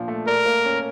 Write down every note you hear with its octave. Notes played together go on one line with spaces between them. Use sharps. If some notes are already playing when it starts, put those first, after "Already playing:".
Already playing: A#2 F3 D4
A3
A#4 D5
A#3
C#4